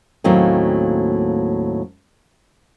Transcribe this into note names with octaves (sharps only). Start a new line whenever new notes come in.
D#2 A2 F#3 A#3 C4 C#4